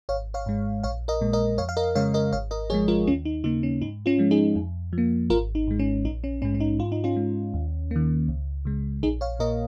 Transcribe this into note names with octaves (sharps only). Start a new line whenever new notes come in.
G#1 C#5 F5
C#5 F5
G#2 G#3
A#1 C#5 F5
A#4 D#5
A#2 G#3
A#4 D#5
F2 C#5 F5
F5
A#4 D#5
C#3 G#3 C#5 F5
A#4 D#5
G#1 C#5 F5
A#4 D#5
G#2 F3 G#3 G#4 C#5
F4 A#4
D#2 C#4 F4
D#4
C#3 A#3 D#4
C#4
G#2 D#4
C#4 F4
F3 G#3
D#4 G#4
F2
F3
A#3
G#1 F4 A#4
D#4
G#2 G#3
C#4
A#1 D#4
C#4
G#2 G#3 C#4
C#4
D#4
G#2 F4
D#4
C#4 F4
G#3
D#2
D#3 A#3
C#2
C#3 G#3
A#1 D#4 G#4
C#5 F5
A#2 A#3 A#4 D#5